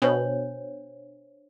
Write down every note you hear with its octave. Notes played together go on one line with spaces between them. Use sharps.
B2 D4 C5 C#5